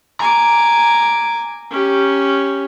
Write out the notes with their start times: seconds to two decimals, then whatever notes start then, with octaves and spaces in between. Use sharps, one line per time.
0.20 G#5 A#5 D6
1.70 C#4 G4